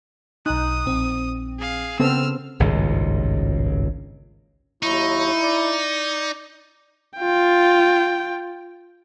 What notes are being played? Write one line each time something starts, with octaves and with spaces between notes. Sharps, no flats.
B1 D#4 D#6 F#6
A#1 C4
G#4 F5
C#3 B3 C4 A4 E6 F6
G#1 C#2 G2 A#2
D#2 F#3 D#4 E4 C#6
D5
F4 G5